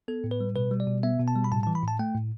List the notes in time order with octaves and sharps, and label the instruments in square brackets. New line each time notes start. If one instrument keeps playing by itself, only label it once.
[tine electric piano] B3 A4
A2
B4
G3
B2 B4
G3
D5
B2
B3 E5
B2
A5
G3
B5
A2 A5
A5
E3
B5
A2 A5
A3 G5
A2